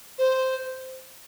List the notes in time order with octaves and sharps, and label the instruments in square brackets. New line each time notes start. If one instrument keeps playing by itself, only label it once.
[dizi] C5